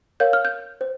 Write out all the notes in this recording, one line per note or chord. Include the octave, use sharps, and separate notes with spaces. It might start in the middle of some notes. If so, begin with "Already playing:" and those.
A#4 C#5 F5 G6
F6
G6
C5